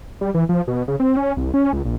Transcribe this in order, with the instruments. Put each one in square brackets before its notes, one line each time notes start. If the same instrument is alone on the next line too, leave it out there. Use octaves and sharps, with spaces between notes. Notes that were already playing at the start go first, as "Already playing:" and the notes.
[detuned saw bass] G3
E3
F3
B2
C#3
C4
C#4
C2
C#4
C#2
A#1